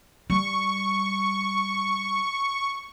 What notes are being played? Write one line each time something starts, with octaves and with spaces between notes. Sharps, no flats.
G3 C#6